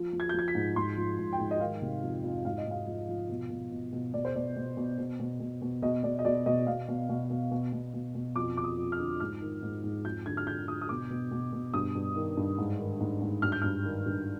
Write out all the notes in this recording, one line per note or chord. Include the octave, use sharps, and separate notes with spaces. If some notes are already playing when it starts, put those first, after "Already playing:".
Already playing: F3
F3
G#6
G6
F3 G#6
B6
G#2
G#2 C6
F3
G#2
G5
G#2
D#5
D#3 F5
C3
F2
F2
G#2 F5
D#5
G#2
F5
F3
F3
B2
B2
B2
B2
B2 D5
C5
B2 D5
B2
B2
B2
B2
B2
B2
B2 D#5
B2 D5
D#5
B2 D5
B2 D#5
B2 F5
B2
B2
B2
B2
B2
B2
B2
F2 D6
F2 D6
D#6
F2
F6
D3
G#2 F6
D#3
G#2
G#2
F2 G6
D3 G#6
F6
D3 G6
D3 D#6
D#6
B2 D6
B2
B2
B2
G2 D#6
G2
D#3
G2
G#2
D#3
G#2
G#2
G2 F6
G6
G2 F6
D#3
G2